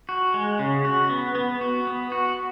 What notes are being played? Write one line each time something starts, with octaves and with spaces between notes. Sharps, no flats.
F#4
G#3
C#3
F#4
B3
B3
F#4
B3
F#4